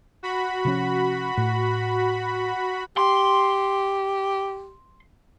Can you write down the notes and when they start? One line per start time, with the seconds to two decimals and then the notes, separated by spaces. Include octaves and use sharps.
0.23 F#4 B5
0.65 C3 F3 C#4
1.37 A2
2.97 G4 C6